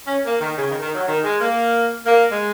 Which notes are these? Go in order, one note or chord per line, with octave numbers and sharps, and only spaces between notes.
C#4
A#3
D#3
C#3
D#3
D#3
F#3
D#3
G#3
A#3
A#3
G#3